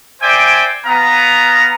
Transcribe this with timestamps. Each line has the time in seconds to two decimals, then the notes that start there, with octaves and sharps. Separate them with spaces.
0.22 C5 D5 E5 G5 G#5 D6
0.86 B3 F5 A#5